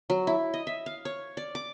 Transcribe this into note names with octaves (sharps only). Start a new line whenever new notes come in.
F#3
E4
D#5
E5
F5
C#5
D5
D6